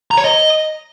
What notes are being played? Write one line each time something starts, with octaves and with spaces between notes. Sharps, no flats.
A#5
C#5
D#5